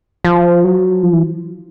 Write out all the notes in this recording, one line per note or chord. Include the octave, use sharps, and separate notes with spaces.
F3
F#3
F3
E3